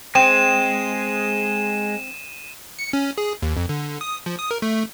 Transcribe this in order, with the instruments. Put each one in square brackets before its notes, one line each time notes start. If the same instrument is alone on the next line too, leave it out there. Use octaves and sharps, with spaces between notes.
[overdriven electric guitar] G#3 [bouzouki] C4 [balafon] G5 [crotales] D#7 E7
[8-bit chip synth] C#7
C#4
G#4
D#2
F2
D3
D#6
F3
D#6
A#4
A3